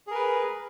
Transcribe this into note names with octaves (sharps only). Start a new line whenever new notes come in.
G#4 A#4 B4